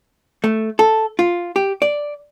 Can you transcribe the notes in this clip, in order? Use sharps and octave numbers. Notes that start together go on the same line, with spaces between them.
A3
A4
F4
G4
D5